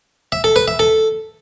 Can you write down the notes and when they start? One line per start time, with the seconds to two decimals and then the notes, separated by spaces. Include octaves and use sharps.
0.32 E5
0.44 A4
0.56 B4
0.68 E5
0.79 A4